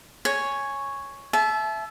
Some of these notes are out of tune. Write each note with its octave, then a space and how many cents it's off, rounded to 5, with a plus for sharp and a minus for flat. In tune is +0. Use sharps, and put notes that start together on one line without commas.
C#5 +0 G#5 +0
E5 +10 A5 -35